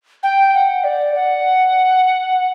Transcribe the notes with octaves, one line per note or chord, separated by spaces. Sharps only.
G5
F#5
D5
F#5